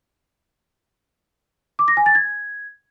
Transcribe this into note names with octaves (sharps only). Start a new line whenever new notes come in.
D6
A#6
G#5
A6
G#6